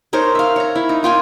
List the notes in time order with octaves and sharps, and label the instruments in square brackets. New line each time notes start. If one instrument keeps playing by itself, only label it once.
[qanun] D#4 A#4 C5 C#5
E5 F5
C#5 A#5
E4
D#4
A#3 F4 G5 G#5